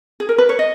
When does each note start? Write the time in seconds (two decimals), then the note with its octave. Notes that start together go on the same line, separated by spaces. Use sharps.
0.20 G#4
0.29 A#4
0.38 B4
0.49 C#5
0.59 D#5